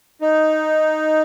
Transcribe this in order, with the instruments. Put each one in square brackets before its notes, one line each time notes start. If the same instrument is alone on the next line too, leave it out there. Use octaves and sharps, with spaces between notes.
[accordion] D#4